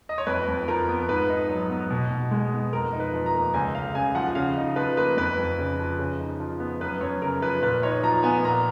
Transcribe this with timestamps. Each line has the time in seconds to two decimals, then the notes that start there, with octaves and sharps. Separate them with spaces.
0.09 D#5
0.18 C#5
0.27 F2 B4
0.48 F2
0.68 F3 A#4
0.88 B3
1.09 G#2 B4
1.29 D#4
1.49 F#3
1.70 B3
1.90 B2
2.10 B2
2.31 G#3
2.52 B3
2.73 F2 A#4
2.93 D#4
3.00 B4
3.13 F3
3.26 A#5
3.34 A#3
3.54 C#2 G#5
3.74 C#2 F5
3.95 C#3 G#5
4.15 F3 F#5
4.35 C#3 F5
4.57 D#4
4.76 F3 B4
4.97 A#3 B4
5.17 F2 B4
5.37 F2
5.59 C#3
5.79 F3
5.98 C#3
6.20 D#4
6.40 F3
6.60 B3
6.81 F#2 B4
7.01 F#2 C#5
7.22 C#3 A#4
7.42 F3 B4
7.62 A#2 B4
7.83 D#4 C#5
8.03 F3 A#5
8.23 B3 G#5
8.44 A#2 A#5